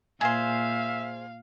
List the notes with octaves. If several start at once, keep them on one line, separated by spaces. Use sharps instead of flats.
A#2 G#4 C5 E5 F5